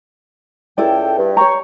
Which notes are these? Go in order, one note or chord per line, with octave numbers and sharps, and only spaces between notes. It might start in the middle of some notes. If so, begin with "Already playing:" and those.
C#2 E4 A4 D5 G5
G2
C#5 G5 A#5 C#6